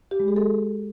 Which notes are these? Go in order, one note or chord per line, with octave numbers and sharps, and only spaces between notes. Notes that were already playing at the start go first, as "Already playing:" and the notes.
G4
G#3
G#4
A4